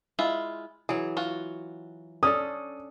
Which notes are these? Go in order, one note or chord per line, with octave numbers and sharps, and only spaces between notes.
G#3 E4 F4
E3 F#3 G#4
F4 F#4
C#4 D4 A4 D#6